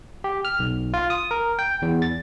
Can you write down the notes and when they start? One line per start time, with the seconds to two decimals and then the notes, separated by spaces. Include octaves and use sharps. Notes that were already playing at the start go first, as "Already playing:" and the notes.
0.24 G4
0.45 F6
0.59 B1
0.94 F4
1.10 D#6
1.31 A#4
1.59 G5
1.82 E2
2.02 A6